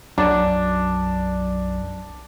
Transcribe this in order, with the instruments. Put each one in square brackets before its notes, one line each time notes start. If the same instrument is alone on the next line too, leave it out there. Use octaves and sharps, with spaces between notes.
[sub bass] B1 [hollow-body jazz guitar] F#2 [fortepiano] D4